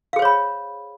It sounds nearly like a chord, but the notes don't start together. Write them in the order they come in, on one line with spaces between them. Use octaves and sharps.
F5 G#4 C5 C#5 B5